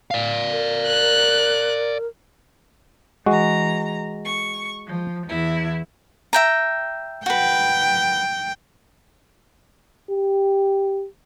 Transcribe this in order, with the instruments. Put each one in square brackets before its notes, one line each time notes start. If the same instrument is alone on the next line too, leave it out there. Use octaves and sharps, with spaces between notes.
[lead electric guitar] D5 F5
[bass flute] A#4
[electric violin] F#6
[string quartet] E3 A#5 [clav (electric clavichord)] G#3 F#4
[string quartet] C#6
F3
E2 E4
[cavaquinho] E5 G5 A#5
[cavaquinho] F#4 B4 [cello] G5
[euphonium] G4